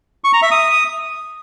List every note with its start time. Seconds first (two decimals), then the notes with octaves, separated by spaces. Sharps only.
0.24 C#6
0.33 A#5
0.42 E5
0.51 D#6